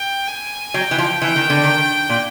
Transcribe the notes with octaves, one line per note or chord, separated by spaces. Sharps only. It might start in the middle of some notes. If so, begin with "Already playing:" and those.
Already playing: G5
G#5
F#3 G5
E3
F3
E3 G5
D#3
D3
D#3
A#2